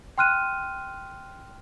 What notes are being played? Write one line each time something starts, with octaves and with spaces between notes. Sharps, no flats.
G5 C6 F6 F#6 D#7